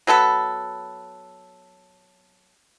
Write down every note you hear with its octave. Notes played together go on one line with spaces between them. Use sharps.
F#3 B3 A4 B4